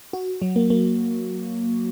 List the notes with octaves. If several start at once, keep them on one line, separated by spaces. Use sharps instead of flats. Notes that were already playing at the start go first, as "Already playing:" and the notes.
F#4
F#3
A#3
A#3